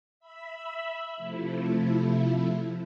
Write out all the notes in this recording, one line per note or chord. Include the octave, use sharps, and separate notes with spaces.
E5 B5
C3 F3 A3 E4